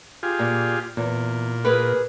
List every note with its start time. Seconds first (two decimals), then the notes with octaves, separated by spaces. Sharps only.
0.23 F4 G4 G#4
0.39 A#2
0.97 E2 A#2
1.65 G#4 A#4 B4